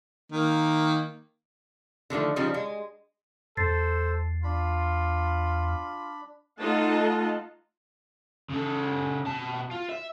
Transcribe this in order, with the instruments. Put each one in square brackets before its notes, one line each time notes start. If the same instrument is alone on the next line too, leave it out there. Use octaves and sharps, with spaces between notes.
[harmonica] D#3 A#3
[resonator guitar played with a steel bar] D3 D#3 F3 A3
C#3 F3 G3 D#4
G#3
[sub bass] E2 [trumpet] A4 [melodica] C5 [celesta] A6 C7
[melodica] D4 B5 [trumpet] F4
[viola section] A3 D#4 F4 A4 F#5 A5
[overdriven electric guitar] C#3 A4
B2 A5
F4
E5